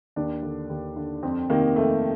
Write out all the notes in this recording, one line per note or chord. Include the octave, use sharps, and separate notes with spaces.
D#2 D4
D3
D#2
D3
F2 C4
C3 D#3 A#3
F2 A3